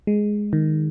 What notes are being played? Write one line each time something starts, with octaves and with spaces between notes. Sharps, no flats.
G#3
D#3